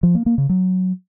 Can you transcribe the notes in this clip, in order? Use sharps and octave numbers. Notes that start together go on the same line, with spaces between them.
F3
A#3
A#3
C#3
F#3